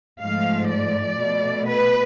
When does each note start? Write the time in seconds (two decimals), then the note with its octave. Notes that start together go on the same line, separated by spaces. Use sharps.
0.20 G#2 F3 A3 F5
0.69 D5
1.18 B2 A3
1.67 B4